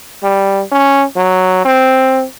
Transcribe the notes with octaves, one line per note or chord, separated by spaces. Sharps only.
G3
C#4
F#3
C4